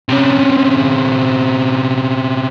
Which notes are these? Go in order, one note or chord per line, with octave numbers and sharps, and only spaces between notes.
C3 C#4